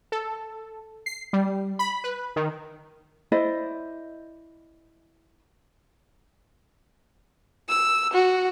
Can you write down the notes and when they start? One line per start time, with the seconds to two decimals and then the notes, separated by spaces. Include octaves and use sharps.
0.12 A4
1.06 C7
1.33 G3
1.79 B5
2.04 B4
2.36 D#3
3.32 E4 C5 D5 D#5
7.69 E6
8.13 F#4